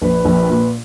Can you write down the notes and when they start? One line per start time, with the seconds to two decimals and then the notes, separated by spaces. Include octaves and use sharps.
0.02 A#1 B4
0.25 A#1
0.49 A#2